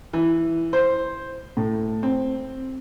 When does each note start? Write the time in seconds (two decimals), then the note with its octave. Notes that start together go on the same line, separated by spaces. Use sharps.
0.13 E3
0.73 C5
1.57 A2
2.03 C4